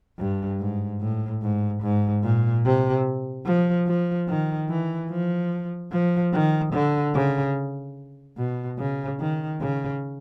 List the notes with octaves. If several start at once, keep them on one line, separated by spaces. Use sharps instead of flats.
G2
G#2
A2
G#2
G#2
A#2
C3
F3
F3
D#3
E3
F3
F3
D#3
D3
C#3
B2
C#3
D#3
C#3